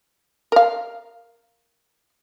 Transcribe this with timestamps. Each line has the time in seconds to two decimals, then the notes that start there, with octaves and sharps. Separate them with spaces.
0.52 A#4 F5